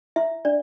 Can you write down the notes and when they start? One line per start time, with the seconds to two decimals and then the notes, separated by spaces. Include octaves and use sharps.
0.16 E4 E5
0.45 D4 D5